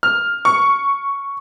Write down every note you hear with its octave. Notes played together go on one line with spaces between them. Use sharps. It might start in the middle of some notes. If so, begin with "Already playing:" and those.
F6
C#6